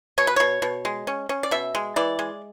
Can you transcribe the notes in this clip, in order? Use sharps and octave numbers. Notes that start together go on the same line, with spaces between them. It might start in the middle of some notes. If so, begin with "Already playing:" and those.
B2 C#5
B4
B2 C#5
B2
G#3
C#4
C#4
D5
B2 E5
G#3
E3 D5
G#3